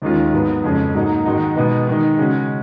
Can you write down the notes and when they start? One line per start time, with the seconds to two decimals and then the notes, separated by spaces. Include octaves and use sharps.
0.02 D#2 D#3 G#3 C#4 F4
0.33 G#2 F#3 B3
0.64 F2 C#3 G#3 C#4
0.94 G#2 F#3 A#3 D#4
1.25 G#2 D#3 G#3 D#4 F#4
1.56 B2 G#3 B3 D#4
1.87 D#3 G#3 D#4
2.18 C#3 G#3 C#4 F#4